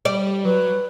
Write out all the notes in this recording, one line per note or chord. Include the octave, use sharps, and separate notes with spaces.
G3 D5
F#3 B4